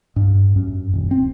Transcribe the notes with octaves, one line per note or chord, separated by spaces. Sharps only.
G2
F#2
D#1
C4